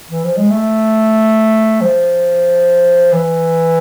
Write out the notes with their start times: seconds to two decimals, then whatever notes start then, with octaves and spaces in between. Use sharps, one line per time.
0.10 E3
0.24 F3
0.37 G#3
0.50 A3
1.81 F3
3.12 E3